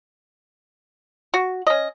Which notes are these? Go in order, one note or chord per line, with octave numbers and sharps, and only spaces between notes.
F#4
C#4 D#5